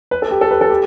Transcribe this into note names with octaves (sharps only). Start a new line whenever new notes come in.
B4
A4
G4
A4
B4
A4
G4